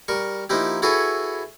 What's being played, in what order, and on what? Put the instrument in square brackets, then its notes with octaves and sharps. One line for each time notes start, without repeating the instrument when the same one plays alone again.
[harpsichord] G3 A#4 C#6
F3 A#3 D#4 E4 G4
E4 F#4 G#4 A4 B4 C#5